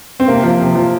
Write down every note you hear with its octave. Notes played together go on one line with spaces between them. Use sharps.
C4
C3 A#3
F3
C3
F3